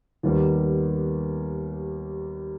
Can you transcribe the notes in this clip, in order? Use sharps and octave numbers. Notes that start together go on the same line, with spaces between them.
D#2 D#3 G3 B3